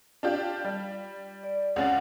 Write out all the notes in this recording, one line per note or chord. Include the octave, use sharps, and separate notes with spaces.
D4 F4 G4
G3
D5
C#2 C#4 F#5 A6